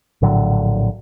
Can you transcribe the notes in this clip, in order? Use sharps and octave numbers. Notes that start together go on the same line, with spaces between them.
A#1 A2 D3 F#3